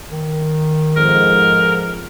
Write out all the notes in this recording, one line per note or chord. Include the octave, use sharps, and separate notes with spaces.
D#3
F2 G#2 G#3 A#4